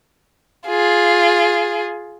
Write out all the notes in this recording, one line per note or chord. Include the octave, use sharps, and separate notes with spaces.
F4 G#4